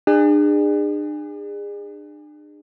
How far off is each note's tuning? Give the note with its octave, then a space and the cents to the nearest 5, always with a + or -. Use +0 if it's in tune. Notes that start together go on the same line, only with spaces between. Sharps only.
D4 +35 G#4 -30